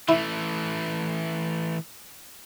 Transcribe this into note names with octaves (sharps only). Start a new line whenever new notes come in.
E3 A3 E4